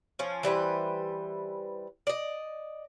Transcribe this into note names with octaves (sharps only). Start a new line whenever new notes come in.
F3 C#4
E3 G3 B4 C5
D5 D#5